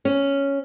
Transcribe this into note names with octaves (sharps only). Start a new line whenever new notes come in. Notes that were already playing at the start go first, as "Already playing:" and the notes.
C#4